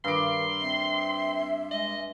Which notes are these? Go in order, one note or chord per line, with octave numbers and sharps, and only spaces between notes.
G2 D#3 C6 D6
C4 E5
G#3 D#5